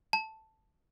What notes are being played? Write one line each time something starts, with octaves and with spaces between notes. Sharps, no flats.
A5